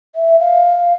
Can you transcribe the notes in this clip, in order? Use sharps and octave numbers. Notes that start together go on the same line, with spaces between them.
E5
F5